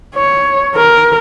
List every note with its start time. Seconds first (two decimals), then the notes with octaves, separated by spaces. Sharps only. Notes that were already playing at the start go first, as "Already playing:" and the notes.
0.15 C#5
0.76 A#4